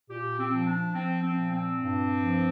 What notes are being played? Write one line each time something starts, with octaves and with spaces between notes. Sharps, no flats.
A#2 G4
C4
F3
D4
F3 C4
C4
A#2
C4
G2
F3